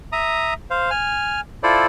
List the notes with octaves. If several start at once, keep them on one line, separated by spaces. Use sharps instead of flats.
E5 A#5 D#6
C5 F5
G#5 F6
E4 F4 A4 C5 D5